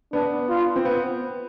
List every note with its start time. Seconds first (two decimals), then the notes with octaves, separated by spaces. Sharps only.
0.13 B3 D4
0.49 F4
0.76 C4
0.85 B3